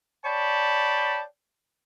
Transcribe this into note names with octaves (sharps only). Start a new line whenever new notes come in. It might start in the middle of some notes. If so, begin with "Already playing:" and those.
C#5 D5 G5 A5 B5